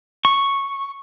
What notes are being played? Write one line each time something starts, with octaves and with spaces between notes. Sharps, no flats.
C#6